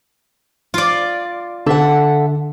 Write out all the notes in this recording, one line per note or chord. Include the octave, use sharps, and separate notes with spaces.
F4 D5
D3 A4 E5 F#5